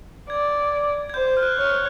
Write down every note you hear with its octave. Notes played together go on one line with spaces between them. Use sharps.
D5 G#6
G#6
C5 G6
F6
F#6
C#5 F6
F#6